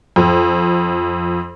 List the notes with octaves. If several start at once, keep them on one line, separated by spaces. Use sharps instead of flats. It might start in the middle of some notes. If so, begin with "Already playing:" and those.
F2